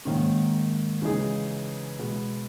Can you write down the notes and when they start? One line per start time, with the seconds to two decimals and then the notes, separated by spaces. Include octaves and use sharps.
0.05 G#2 D#3 A#3 C#4
1.02 C#3 E3 G#3 D#4 G#4
1.99 B2 G#3 B3